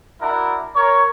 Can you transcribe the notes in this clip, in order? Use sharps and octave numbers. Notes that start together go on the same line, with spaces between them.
D4 E4 F#4 A#4
A#4 C#5